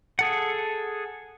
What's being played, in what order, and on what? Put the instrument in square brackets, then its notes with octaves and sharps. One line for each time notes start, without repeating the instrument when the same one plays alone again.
[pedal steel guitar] G#4 A4 F#5